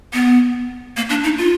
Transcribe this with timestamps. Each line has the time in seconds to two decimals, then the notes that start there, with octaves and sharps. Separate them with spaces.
0.13 B3
0.97 A#3
1.10 D4
1.24 D#4
1.38 F4